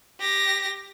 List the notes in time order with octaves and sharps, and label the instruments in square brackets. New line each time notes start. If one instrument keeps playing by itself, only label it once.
[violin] G4 A#6